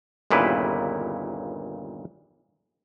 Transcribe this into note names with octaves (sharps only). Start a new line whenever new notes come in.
G1 D#2 A#2 C#3 E4 B4